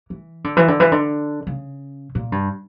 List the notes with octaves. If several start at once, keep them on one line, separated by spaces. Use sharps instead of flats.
E3
D3
E3
D3
E3
D3
C#3
A#2
G2